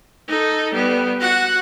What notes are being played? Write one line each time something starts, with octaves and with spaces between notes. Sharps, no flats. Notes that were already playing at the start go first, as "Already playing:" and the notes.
D#4 A4
G3 B3
F#4 F#5